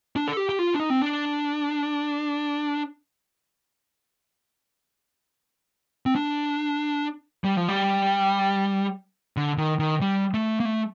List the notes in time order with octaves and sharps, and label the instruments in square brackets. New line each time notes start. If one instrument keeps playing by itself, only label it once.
[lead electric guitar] D4
A4
G4
G4
F4
D4
D#4
C4
D4
C4
D4
G3
F3
G3
D3
D#3
D#3
G3
A3
A#3
A3